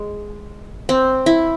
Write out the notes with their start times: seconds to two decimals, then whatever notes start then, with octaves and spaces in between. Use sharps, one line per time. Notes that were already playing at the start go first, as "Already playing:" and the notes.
Already playing: G#3
0.89 C4
1.26 E4